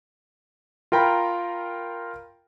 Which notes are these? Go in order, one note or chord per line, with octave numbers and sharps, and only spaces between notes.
F4 A#4 G5 A#5 B5